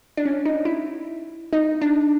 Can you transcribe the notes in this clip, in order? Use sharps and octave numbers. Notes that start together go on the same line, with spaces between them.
D4
C#4
D#4
E4
D#4
D4